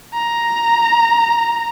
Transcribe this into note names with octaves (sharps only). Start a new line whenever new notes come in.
A#5